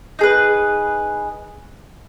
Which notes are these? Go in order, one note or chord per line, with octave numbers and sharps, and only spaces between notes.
D#4 G#4 B4